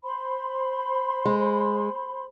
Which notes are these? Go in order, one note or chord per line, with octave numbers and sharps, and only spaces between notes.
C5 B5 C6
G#3